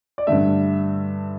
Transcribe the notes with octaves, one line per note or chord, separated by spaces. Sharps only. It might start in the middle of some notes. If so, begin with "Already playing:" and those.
D5
G2 D3 A3 E5